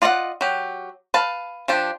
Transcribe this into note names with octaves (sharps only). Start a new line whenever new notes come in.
F4 D5 D#5 F5 F#5
F#3 G4
B4 F5 A5
F3 D4 G4